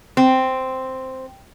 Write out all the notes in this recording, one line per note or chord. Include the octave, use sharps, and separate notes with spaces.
C4